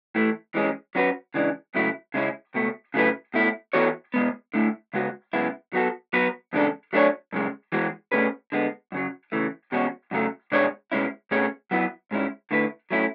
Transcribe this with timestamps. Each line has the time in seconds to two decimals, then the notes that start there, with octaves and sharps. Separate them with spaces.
0.15 A2 E3 A3
0.55 E3 G#3 C#4
0.95 F#3 C#4 F#4 B4
1.34 C#3 E3 G#3 D4
1.74 C#2 C#3 F#3 A3 E4
2.14 C#3 G#3 C#4 E4
2.54 C#2 B2 A3
2.94 C#3 F#3 A3 E4 B4
3.34 B2 A3 E4
3.73 E3 B3 F#4 A4 C#5
4.14 B2 G#3 B3
4.54 D3 A3 E4
4.93 C#3 G#3 B3 F#4
5.33 F#2 C#3 G#3 B3 E4
5.73 F#3 B3 F#4 A4
6.13 F#3 B3 F#4 B4
6.53 E2 C#3 G#3 D4 A4
6.93 F#3 A3 D4 A4 C#5
7.33 F#2 C#3 G#3
7.72 E3 G#3 B3 F#4
8.12 B2 A3 C#4 G#4 B4
8.52 D3 G#3 B3
8.92 F#2 C#3 F#3
9.32 C#3 E3 A3
9.72 E2 B2 G#3 C#4 F#4
10.11 F#2 C#3 F#3 A3
10.52 B2 G#3 D4 G#4 C#5
10.92 B2 G#3 C#4 E4
11.31 B2 A3 C#4 G#4 C#5
11.71 F#3 B3 E4 B4
12.11 G#2 G#3 C#4 E4
12.51 D3 A3 E4 B4
12.91 F#3 A3 C#4 E4